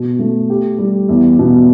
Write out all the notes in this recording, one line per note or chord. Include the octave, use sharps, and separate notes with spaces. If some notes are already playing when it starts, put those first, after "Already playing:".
Already playing: B2
A3
G4
G3
E2
B2